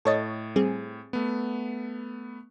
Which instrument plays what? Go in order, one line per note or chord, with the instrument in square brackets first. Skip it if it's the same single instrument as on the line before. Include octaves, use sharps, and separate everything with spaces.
[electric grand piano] A2 A6 [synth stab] A4 C#5 D#5
[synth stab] G3 C4 G#4
[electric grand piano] A3 B3